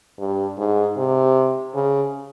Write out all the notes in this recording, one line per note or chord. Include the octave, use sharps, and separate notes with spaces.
G2
G#2
C3
C#3